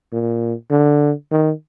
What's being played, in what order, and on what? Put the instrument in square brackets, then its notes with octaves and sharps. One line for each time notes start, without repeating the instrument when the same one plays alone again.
[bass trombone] A#2
D3
D#3